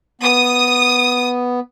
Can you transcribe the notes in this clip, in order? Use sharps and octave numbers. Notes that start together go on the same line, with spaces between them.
B3 D#6